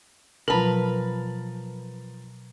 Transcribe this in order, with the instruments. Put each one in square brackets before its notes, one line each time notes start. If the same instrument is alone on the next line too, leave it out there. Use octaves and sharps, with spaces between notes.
[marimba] B2 F#3 [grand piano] F3 A5 F#7 [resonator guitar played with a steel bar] A#4 B4